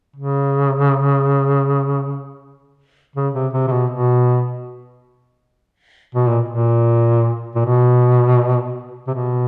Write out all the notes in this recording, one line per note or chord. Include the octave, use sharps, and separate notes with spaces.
C#3
C#3
C3
C3
C3
B2
B2
B2
A#2
A#2
A#2
B2
C3
B2